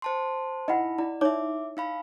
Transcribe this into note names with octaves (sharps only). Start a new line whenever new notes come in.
C5 A5 C6
D#4 E4 D#5 F#5 B5
E4 D5
D#4 C#5 E5 D6
D#4 F5 B5